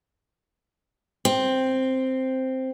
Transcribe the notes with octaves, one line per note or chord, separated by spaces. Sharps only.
C4